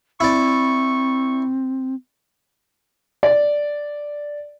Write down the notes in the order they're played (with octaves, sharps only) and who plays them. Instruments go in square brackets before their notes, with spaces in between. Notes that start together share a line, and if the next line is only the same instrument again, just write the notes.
[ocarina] C4 [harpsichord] E4 D5 [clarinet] C#6
[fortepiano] D5